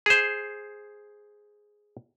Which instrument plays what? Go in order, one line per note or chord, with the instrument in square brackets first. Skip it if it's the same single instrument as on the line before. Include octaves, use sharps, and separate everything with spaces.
[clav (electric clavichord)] G#4 C5